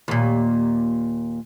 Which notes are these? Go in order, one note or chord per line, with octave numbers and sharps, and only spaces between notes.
D#2 A#2